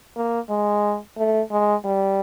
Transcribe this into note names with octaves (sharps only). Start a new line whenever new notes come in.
A#3
G#3
A3
G#3
G3